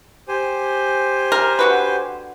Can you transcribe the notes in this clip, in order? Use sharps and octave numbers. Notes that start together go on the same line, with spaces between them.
G4 C5 G#5
A#4
D3 F#4 B4